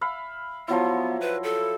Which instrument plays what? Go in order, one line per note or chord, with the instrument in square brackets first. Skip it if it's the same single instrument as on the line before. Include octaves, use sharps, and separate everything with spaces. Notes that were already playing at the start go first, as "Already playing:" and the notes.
[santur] E5 F5 B5
[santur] F3 F#3 E4 [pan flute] B3
[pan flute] B4
A4